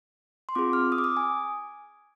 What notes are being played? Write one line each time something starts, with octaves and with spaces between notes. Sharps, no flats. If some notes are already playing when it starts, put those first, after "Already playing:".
C6
C4 F4 G#4 D6
F6
D#6
D6
D#6
G#5